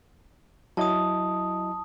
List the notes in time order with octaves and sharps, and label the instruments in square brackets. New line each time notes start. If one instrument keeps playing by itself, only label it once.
[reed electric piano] F#3 E4 D#5 [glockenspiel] A5 D#6